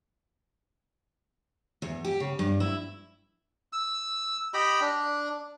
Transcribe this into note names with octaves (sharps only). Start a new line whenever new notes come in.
E2
G4
C#3
G2
E4
E6
G4 D#5 G5 B5
D4